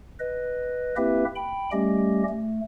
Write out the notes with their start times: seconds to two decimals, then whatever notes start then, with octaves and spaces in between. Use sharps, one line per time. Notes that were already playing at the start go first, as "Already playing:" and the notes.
0.20 B4 D#5
0.97 A#3 C4 E4 G4 B4 E5
1.36 G5 B5
1.72 G3 A3 C#4 G4 D#5
2.29 A3